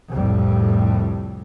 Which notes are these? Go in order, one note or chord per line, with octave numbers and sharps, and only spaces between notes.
C2 F2 A2 G3